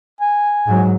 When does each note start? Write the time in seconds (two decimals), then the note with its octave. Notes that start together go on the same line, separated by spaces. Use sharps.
0.21 G#5
0.67 G#2 F#3